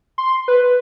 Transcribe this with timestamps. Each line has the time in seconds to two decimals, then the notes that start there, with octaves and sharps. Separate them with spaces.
0.18 C6
0.48 B4